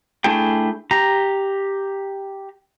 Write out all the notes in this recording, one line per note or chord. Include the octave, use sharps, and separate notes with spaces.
A3 D4 E4 G#4 G5
G4 A#5